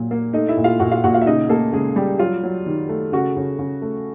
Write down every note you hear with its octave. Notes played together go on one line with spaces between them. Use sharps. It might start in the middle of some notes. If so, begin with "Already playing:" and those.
Already playing: A#2 F#3
A#3
A3 D#4 D#5
E4 E5
A#2
F4 F5
A#2 F#4 F#5
F4 F5
A#2 F#4 F#5
F4 F5
E5
C#3 D#4 D#5
A3 A#3 A4
C#3 G#3 G#4
G3 G4
F#3 F4
F#3
D#3
A3
C#3 F#4
C#3
C#3
A3